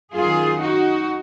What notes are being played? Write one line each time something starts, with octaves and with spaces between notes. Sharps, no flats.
F#2 D#3 F4 G#4
D#4 F#4